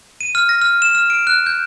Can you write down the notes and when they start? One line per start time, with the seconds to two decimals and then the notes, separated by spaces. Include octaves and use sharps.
0.21 D#7
0.35 F6
0.49 A#6
0.62 F6
0.82 E7
0.95 F6
1.10 D7
1.27 F#6
1.46 G6